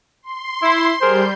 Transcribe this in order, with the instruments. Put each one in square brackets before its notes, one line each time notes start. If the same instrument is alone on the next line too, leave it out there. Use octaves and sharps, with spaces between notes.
[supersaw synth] C6
[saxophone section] E4
[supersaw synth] G3 G6 [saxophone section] G#4 A#4 C5